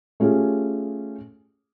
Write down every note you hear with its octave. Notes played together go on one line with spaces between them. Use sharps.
A3 C#4 F4 G4 G#4